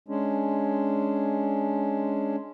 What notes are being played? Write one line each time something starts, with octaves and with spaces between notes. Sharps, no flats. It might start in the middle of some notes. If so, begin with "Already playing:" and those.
G#3 C#4 D4